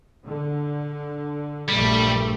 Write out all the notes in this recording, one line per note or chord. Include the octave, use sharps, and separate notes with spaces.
D3
A#1 G2 G3 A3